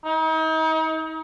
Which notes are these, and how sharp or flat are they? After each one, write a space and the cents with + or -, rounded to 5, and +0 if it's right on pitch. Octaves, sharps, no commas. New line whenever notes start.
D#4 +40